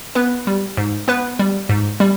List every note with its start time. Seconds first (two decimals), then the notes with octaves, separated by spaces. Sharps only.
0.15 B3 B4
0.47 G3
0.77 G#2
1.08 B3 B4
1.39 G3
1.69 G#2
2.00 G3